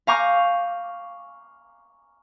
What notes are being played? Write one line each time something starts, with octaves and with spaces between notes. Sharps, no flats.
F5 G#5 A#5 C#6 D6 G6